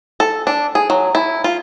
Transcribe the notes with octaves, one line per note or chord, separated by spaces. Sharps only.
A4
D4
G#4
F#3
E4
F4